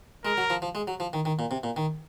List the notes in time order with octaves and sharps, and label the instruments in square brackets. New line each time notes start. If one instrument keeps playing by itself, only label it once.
[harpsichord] G#3 [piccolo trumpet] A#4
[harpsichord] F#3
F3
F3
G#3
F#3
F3
D#3
D#3
A#2
C3
A#2
D#3